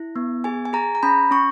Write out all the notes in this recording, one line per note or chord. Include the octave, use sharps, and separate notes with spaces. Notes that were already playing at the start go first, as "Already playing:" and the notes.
Already playing: E4
B3
G#4 G#5
G#5
G#4 A#5
A#5
C#4 B5
C#4 C#6